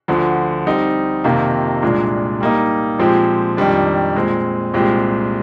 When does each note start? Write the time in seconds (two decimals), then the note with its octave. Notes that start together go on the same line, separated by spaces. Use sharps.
0.08 D2 D3 F3
0.66 G3 C4 D#4
1.24 F2 C3 D#3 A#3 F4
1.82 C2 A#2 G#3 D4
2.40 G3 A#3 D#4
2.99 A#2 F3 G#3 C4 G4
3.57 F2 D#3 G3 D4
4.15 A#2 G#3 C4
4.74 C2 A#2 G#3 C4 G4